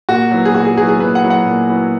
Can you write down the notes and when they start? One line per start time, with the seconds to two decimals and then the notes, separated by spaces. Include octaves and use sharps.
0.09 A#2 F#4
0.31 F#3 B3 E4
0.45 G#4
0.54 A#2 F#4
0.65 G#4
0.77 F#3 B3 E4 G#4
0.89 G#4
1.00 A#2 B4
1.15 F#5
1.23 F#3 B3 E4
1.30 F#5
1.46 A#2
1.69 F#3 B3 E4